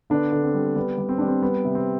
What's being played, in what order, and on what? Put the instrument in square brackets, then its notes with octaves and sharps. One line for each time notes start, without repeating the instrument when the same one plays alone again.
[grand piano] D3 B3 D4
D3
C4
G3
G3 B3
G3
C4
G3 D4
C4
G3 B3
C3
C4